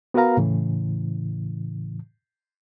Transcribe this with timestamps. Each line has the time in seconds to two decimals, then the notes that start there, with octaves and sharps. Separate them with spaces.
0.14 B3 F#4 A#4 B4 F5 A#5
0.37 A2 C#3 E3